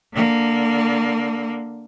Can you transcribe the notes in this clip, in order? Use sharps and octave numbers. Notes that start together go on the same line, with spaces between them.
D3 A#3